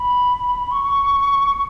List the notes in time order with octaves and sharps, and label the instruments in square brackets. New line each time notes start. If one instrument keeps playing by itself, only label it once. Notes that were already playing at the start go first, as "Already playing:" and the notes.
Already playing: [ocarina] B5
C#6